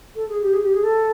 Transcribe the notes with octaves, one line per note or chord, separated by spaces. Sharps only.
A4
G#4
G4
G#4
G4
G#4
A4